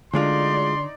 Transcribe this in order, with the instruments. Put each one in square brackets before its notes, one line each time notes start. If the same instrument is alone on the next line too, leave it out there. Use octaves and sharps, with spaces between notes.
[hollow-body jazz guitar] D2 G#3 F4 [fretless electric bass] D3 [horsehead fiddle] D#4 D5 [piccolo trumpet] C6